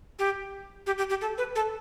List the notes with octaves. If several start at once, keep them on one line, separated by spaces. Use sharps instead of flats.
G4
G4
G4
G4
A4
B4
A4